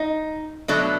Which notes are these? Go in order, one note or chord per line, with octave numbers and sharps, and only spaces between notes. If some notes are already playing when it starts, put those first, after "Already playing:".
Already playing: D#4
B2 F#3 A3 D4